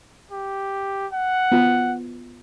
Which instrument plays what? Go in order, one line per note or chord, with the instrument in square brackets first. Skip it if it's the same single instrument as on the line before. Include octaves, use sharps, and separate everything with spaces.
[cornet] G4
F#5
[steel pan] B3 F4